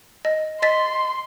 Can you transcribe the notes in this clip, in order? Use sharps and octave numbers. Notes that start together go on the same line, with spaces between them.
D#5
D#5 C6 A6 B6